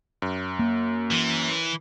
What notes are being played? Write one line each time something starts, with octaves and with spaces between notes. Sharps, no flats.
F#2
A#3
E3